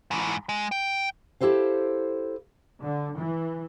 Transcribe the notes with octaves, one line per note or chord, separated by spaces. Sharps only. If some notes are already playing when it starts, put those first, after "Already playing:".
G#2 E3
G#3
G5
E4 G4 A4 C5 F5
D3
E3